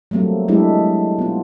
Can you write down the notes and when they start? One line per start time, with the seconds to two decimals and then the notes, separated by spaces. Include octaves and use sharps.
0.11 F#3 G3 A3 A#3 C4
0.48 F#3 G#3 A3 D4 E4 G4
1.19 B3 F4